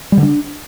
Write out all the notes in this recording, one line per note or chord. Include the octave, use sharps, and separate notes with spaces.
G3
D3
D4